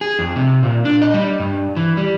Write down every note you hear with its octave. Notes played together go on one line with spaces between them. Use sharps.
G#4
F2
C3
A#2
D4
D#5
G3
G2
E3
G3